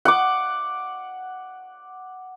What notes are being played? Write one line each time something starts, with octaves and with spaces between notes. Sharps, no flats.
F#5 D6